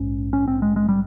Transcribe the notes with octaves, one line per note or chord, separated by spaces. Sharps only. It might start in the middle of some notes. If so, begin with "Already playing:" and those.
Already playing: A#1 G#2 C#4
C#4
C4
G#3
G#3
G3